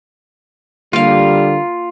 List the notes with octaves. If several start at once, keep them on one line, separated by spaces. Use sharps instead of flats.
D3 G3 A#3 F4 F5